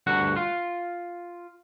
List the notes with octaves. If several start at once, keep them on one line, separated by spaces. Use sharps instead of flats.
D2 G2 F#4 F#5
F4